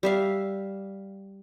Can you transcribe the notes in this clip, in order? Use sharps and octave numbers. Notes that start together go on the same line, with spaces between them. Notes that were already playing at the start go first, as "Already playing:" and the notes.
G3 E5 F5